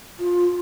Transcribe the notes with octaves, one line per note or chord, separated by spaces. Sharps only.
F4